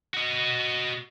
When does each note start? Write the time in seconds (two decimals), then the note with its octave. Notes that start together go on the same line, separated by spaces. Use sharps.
0.14 F#4 D#5